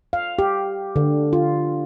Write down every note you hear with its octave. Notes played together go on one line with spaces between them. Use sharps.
F5
G4
D3
F4